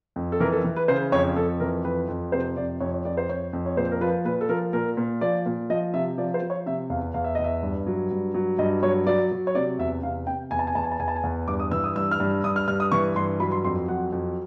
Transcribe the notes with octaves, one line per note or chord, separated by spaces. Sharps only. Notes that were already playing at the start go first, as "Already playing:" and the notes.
F2
A4
E3 A#4
A4
E3
B4
C#3 C5
F2 C#5
F2 A4
E3 A#4
F2 B4
F2
C3 C5
F2 D5
F2 C#5
C#5
F2 D5
C5
F2 C#5
F2
C#5
A#2 C5
A#4
F3 B4
A#2 B4
A4
F3 A#4
A#2 A#4
A#2
F3 D5
A#2
F3 D#5
C3 E5
F3 D5
C5
F3
C#5
C3 E5
E2 F5
E2 F5
E5
E2 D#5
E5
G2
F#3
G2
F#3
G2 D#5
F#3 C#5
F#3 D5
F#3
C#5
C3 D5
E2 E5
C3 F5
C3 G5
E2 G#5
A5
G#5
E2 A5
G#5
A5
E2 G#5
A5
G#5
E2
G2 D6
D#6
E3 E6
D#6
G2 E6
F6
G2
G2 D#6
F6
G2 F6
D#6
E3 C#6
G2 C6
F#3 B5
C6
F2 C6
F#3 F#5
F2